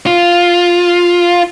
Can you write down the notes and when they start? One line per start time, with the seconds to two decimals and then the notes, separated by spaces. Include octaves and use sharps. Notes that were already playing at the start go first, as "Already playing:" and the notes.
0.06 F4